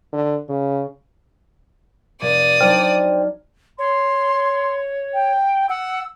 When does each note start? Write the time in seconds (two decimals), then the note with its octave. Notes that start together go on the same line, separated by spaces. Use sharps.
0.13 D3
0.49 C#3
2.21 F1 D5 D#6 G#6 E7
2.61 F#3 D4 D#4 C5 G5 F6
3.79 C#5 C6
5.14 G5
5.69 F#5 E6